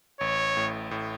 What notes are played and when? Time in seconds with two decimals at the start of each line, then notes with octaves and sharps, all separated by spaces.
0.20 A1 C#5
0.57 A2
0.91 A2